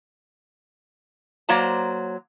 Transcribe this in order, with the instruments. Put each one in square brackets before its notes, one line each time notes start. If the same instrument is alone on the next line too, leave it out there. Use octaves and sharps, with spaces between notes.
[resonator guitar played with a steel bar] F#3 A#3 C5 D5 A#5